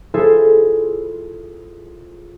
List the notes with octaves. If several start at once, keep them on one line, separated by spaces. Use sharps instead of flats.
E4 F4 G#4 A4 C5 E5